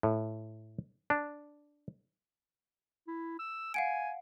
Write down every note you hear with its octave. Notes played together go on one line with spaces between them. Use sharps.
A2
D4
E4
E6
F5 F#5 G#5 D7